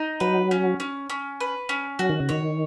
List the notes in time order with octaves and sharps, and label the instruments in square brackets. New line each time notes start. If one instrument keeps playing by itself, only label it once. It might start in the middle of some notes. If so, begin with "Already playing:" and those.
Already playing: [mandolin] D#4
[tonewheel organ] F#3 [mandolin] B4
[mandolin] C#4
C#4
C#4
B4
C#4
[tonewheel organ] F#3 [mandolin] F#4
[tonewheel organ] D#3
C#3
[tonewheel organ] D#3 [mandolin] C#5